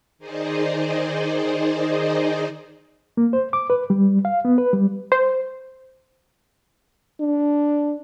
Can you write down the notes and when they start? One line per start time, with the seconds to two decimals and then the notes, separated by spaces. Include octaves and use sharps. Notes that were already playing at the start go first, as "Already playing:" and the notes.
0.19 D#3 D#4 G#4 C5 D5 D#5
3.17 A#3
3.33 C5
3.53 D6
3.70 B4
3.90 G3
4.25 F5
4.45 B3
4.58 B4
4.73 G3
5.12 C5
7.20 D4